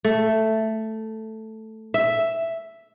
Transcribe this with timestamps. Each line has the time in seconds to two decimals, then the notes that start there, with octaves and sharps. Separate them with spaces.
0.04 A3
1.94 E5